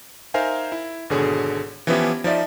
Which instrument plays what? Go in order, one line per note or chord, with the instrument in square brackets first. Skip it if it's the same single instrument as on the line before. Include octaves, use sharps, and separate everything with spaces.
[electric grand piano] D#4 A#4 C5 E5 F5 G#5
E4
G#1 B2 D3 G#4 C#5
E3 F3 B3 C#4 E4 G4
F3 D#4 D5 E5